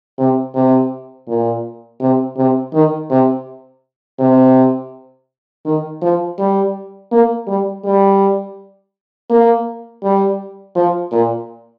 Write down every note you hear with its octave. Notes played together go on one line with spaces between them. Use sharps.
C3
C3
A#2
C3
C3
D#3
C3
C3
D#3
F3
G3
A#3
G3
G3
A#3
G3
F3
A#2